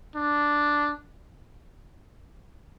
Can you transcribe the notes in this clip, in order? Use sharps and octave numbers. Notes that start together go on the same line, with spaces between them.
D4